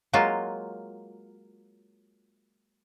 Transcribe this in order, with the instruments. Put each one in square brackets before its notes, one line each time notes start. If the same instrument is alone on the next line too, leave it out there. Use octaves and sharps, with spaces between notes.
[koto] F#3 G#3 A#3 F4